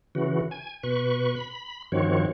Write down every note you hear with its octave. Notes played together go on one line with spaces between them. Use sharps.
C#3 E3 F#4
G#5
B2 B4 C#6
B5
G2 D#3 F3 C4 F#4 C#5